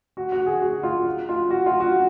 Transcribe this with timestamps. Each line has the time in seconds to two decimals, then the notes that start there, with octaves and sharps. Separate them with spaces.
0.17 F#4
0.32 F#4
0.46 G#4
0.62 F#4
0.83 F4
1.29 F4
1.50 F#4
1.66 F4
1.80 F#4